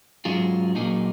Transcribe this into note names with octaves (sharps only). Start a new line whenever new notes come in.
G#2 F#3 C#4 F4 G#4
A#2 F#3 A#3 D#4 G#4